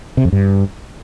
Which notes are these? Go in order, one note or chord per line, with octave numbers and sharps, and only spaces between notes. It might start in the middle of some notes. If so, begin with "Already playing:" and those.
C3
F2
G2